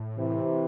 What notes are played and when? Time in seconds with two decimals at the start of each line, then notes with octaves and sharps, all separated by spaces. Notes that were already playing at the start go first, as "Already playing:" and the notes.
Already playing: A2
0.17 C3 E3